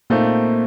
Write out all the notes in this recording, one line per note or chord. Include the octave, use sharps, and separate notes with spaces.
A#2 A3 A#3 C4 D#4